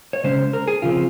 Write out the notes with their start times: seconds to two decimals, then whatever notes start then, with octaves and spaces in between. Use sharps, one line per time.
0.13 C#5
0.24 C#3 G#3 C#4 C5
0.53 A#4
0.68 G#4
0.82 C#3 F3 C4 F4